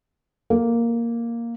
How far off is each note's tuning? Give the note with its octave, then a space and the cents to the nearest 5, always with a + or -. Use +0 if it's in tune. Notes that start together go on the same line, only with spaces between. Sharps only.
A#3 +0